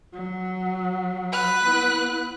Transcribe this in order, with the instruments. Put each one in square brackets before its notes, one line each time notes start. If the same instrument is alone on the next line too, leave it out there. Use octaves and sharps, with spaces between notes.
[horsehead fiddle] F#3
[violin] B4 F#6
[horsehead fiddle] B3 E4